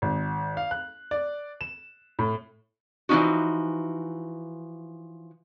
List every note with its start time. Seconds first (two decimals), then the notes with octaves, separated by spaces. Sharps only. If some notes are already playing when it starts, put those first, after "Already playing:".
0.02 G#1
0.57 F5
0.71 F#6
1.11 D5
1.61 E7
2.19 A2
3.09 E3 F3 C#4 D#4 F#4